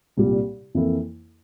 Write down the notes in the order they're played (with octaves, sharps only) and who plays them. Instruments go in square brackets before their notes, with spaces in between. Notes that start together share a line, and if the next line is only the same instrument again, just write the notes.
[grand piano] C2 A#2 G3
F2 E3 A#3 E4 A4